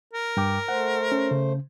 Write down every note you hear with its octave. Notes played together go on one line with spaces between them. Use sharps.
A#4
G2 G5 D6
A3 C5 F#5
C#4
C#3